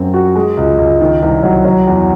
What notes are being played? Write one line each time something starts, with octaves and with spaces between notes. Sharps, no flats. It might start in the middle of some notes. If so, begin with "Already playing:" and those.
Already playing: F#2 C4
F#4
G#3
C#2
C#2
D#3
C2
F#3
F#3
E2